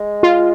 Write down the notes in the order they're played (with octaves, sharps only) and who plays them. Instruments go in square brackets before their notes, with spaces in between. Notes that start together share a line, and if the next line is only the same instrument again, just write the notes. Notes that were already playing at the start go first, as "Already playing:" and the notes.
Already playing: [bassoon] G#3
[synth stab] F4